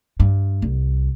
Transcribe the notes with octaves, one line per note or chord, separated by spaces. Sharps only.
G2
C2